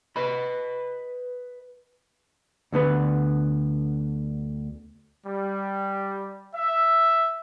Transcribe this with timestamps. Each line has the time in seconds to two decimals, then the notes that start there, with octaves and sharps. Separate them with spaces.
0.16 B4 D#5 B5
2.72 D2 D3 B3 B4
5.26 G3
6.55 E5